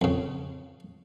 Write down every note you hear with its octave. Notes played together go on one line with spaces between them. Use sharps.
F2 C#3